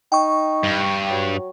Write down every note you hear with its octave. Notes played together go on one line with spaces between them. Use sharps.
D#4 G5 C#6
G2
F#3